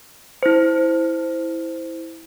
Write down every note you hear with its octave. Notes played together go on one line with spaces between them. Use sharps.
E4 C5